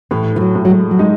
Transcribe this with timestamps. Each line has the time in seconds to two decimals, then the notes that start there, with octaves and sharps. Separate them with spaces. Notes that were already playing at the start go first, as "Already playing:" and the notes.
0.11 A2 E3
0.36 E3
0.41 F#3
0.55 A2
0.65 F#3
0.70 G#3
0.91 F#3
0.99 G#3 D#4